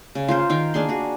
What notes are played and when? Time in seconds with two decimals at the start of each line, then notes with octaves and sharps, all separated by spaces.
0.15 C#3
0.28 F4 A#4 C5
0.50 D#3 A#4 F5 G5
0.74 A#3 D4 G#4 C6
0.89 F#4 G#4